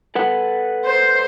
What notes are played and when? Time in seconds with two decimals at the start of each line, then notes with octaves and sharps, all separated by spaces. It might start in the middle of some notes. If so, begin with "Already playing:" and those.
0.15 A4 B4 F#5
0.85 C5